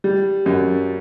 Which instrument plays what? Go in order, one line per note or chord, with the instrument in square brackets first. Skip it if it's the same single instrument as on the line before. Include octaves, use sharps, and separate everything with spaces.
[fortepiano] G3
F#2